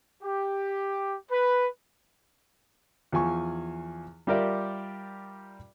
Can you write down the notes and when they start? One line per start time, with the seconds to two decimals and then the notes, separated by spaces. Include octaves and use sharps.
0.23 G4
1.32 B4
3.12 E2 F3 G#5 C#6
4.27 G3 F4 G4 A#4 D5 E5